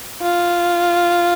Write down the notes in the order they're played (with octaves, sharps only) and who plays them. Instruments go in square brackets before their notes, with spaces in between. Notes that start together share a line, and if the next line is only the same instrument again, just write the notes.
[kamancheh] F4